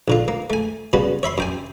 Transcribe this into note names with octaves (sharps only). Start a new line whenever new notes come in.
A#1 D3 F4
A#3
A3 G#5
C#3 G3 B3 F#4
C#5 E5 B5 C6
F#2 G5 G#5